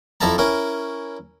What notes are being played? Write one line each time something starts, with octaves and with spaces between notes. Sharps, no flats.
F2 E4 A4 E5 A5 A#5
C#4 E4 A#4